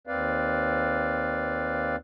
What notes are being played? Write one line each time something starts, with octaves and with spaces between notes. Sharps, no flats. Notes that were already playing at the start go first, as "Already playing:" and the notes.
D#2 C4 B4 D5 F5